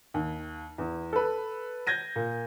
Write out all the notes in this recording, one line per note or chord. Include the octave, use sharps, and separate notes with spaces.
D#2
E2
A4 B4
G6 G#6 A#6 D#7
A#2